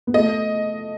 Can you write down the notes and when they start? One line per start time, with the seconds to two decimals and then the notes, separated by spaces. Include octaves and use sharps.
0.07 B3
0.14 A3 D#5